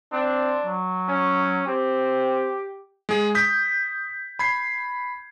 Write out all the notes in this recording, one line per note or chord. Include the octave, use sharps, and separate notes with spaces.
C4 D4
F#3
C#4
C4 G4
G#3 G#4
D#6 G6 B6
B5 G#6 C7